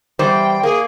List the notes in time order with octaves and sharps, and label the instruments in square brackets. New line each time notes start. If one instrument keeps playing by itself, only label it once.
[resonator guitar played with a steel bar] E2 G3 C5 [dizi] G5
[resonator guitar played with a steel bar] A#3 [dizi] G#4